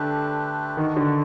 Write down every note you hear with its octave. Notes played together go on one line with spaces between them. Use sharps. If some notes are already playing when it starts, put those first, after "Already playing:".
Already playing: D3 A3 D4 G4 B4
D#3 B3 D4 F#4 A4
D3